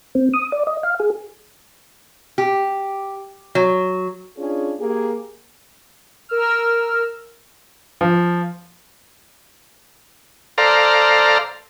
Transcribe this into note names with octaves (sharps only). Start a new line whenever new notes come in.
C4
D#6
D5
D#5
F5
G#4
G4
F#3
C#4 D4 F4 G#4
A#3 G4 G#4
A#4 E6 F6
F3
A4 C5 D5 F5 A#5